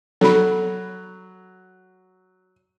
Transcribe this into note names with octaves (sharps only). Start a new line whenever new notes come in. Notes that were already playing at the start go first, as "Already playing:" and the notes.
F#3 A4 B5